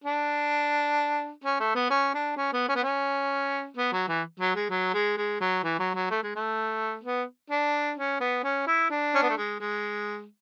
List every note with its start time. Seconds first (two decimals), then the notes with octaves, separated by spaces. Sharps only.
0.04 D4
1.44 C#4
1.60 A3
1.75 B3
1.90 C#4
2.14 D4
2.37 C#4
2.53 B3
2.68 C#4
2.76 B3
2.83 C#4
3.77 B3
3.93 F#3
4.08 E3
4.40 F#3
4.55 G#3
4.70 F#3
4.93 G#3
5.17 G#3
5.41 F#3
5.64 E3
5.79 F#3
5.95 F#3
6.11 A3
6.23 G#3
6.36 A3
7.04 B3
7.50 D4
7.97 C#4
8.20 B3
8.44 C#4
8.67 E4
8.90 D4
9.15 C#4
9.22 B3
9.29 A3
9.37 G#3
9.60 G#3